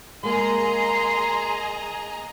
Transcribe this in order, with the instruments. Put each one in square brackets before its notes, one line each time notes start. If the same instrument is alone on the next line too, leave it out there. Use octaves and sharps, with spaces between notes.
[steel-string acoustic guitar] G#3 A#3 [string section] G#4 D#5 A#5 [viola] C6